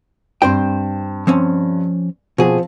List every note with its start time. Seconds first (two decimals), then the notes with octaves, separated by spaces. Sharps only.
0.42 G2 C4 C5 G5
1.27 F3 C4 C#4
2.38 B2 F3 C4 G#4